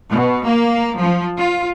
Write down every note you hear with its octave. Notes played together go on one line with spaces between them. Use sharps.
B2
A#3
F3
F4